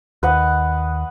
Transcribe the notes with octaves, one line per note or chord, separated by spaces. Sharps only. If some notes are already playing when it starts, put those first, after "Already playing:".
D#2 B4 D#5 F#5